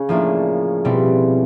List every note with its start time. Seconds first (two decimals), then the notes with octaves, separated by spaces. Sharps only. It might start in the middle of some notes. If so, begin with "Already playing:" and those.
Already playing: C#3
0.09 A2 F3 A#3 D4
0.85 B2 G3 C4 E4